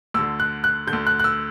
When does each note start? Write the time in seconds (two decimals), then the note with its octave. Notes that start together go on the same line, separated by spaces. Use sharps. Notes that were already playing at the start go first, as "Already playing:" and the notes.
0.14 D2 E6
0.19 D3
0.40 F#6
0.64 F#6
0.87 D3 G6
0.93 D2
1.07 F#6
1.20 F#6
1.24 E6